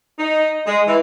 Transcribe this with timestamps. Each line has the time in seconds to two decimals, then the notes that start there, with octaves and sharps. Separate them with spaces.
0.19 D#4
0.67 G#3
0.88 E3